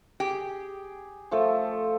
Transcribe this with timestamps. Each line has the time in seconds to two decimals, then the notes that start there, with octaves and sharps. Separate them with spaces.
0.20 G4 G#4
1.31 F3 A3 A4